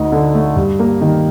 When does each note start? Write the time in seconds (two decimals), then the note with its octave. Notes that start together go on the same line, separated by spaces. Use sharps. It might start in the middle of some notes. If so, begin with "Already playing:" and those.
Already playing: D2 D#4
0.12 D3
0.35 A3
0.56 G2
0.79 A#3
1.02 D#3